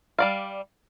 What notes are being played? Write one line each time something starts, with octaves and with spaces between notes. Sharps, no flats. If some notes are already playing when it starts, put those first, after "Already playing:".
G3 D5 F5